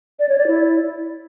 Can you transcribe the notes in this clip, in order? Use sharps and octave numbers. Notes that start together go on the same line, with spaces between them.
D5
C#5
D5
E4